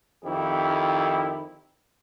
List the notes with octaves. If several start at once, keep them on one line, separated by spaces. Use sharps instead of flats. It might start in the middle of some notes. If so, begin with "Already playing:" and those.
F2 D#3 E4 G4